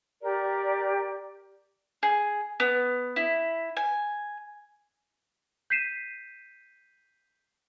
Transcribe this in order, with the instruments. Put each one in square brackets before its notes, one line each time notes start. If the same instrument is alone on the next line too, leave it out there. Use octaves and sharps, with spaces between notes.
[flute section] G4 A#4 D5
[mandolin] G#4
B3
E4
G#5
[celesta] G6 B6 C7 D#7 E7